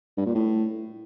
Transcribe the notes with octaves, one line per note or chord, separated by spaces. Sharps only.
G2
A#2
A2